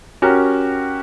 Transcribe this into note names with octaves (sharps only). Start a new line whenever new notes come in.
C#4 F#4 G4 A#4